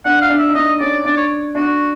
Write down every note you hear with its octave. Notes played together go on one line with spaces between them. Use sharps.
D4 F#5
F5
D4
E5
D#4
D4 D#5
C#4 D5
D4 D5
C#5
D4 F#4